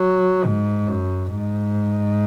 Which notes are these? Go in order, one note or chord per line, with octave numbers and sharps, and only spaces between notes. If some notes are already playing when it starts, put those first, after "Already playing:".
Already playing: F#3
G#2
F#2
G#2